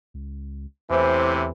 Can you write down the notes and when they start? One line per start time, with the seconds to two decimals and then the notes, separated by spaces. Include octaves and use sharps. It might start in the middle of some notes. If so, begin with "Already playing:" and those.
0.14 C#2
0.90 E2 A2 C3 E3 C5 D6